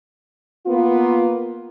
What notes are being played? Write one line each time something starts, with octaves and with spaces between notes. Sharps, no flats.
A#3 B3 F4